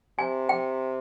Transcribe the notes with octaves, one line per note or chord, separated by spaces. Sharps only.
C3 G#5
G5